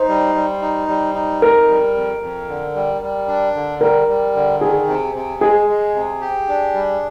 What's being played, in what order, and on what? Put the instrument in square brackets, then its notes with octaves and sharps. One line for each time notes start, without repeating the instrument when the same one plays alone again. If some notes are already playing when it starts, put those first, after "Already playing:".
Already playing: [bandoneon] D#4 [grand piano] C5
[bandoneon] G3
G3
D#4
G3
D#4
[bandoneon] F2 [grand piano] A#4
[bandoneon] G3
F2
F2
D3
G3
G3
D4
D3
[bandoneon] G3 [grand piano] A#4
[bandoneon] G3
D3
[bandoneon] D#3 [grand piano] G#4
[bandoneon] C3
C3
[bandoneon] G#3 [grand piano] G#4
[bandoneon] G#3
C3
G4
D4
G3